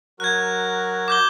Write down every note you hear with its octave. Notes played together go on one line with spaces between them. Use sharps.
F#3 F#4 A#4 F#6 G#6
D6 G6 G7